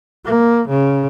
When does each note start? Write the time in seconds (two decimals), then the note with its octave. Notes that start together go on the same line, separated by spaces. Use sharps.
0.25 A#3
0.70 C#3